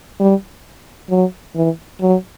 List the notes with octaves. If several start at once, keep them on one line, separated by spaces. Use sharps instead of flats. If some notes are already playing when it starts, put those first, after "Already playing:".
G3
F#3
E3
F#3